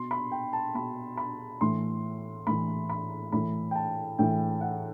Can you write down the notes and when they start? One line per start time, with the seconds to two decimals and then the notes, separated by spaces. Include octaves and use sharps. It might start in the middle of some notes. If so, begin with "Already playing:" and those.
Already playing: B2 C6
0.11 B5
0.32 G5
0.53 A5
0.74 B2 B5
1.17 B5
1.61 A2 E3 C6
2.47 A2 E3 B5
2.90 B5
3.32 A2 E3 B5
3.71 G5
3.76 A5
4.19 A2 E3 G5
4.61 F#5